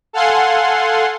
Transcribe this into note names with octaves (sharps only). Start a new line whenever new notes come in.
A4 F5 F#5 G#5 C6